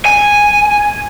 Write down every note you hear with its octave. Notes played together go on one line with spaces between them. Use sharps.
G#5